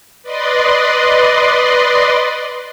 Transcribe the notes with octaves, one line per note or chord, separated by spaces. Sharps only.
B4 D5 D#5 C6